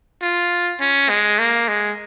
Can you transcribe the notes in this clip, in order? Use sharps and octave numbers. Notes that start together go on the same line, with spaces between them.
F4
C#4
G#3
A#3
G#3